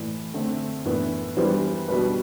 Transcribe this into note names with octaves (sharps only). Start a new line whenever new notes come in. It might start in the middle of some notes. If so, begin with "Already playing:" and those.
Already playing: A2 E3 A3 D5
D3 A3 C4
A2 E3 B3 D4
E3 G3 B3 D4 C5
B2 G3 B3 D4 B4